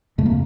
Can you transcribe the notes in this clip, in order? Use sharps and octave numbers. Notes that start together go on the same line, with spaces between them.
F2 C#3 A3
A#3